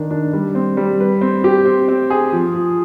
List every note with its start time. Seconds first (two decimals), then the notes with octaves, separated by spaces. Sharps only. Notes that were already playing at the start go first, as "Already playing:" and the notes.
Already playing: D#3 D4
0.11 D4
0.33 G3
0.55 C4
0.77 G3
1.00 B4
1.21 C4
1.44 G4
1.65 C4
1.88 C4
2.10 G#4
2.32 F3
2.54 F3